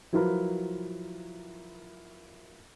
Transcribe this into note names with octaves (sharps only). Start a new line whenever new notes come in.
F3 F#3 E4 F4 A#4 B4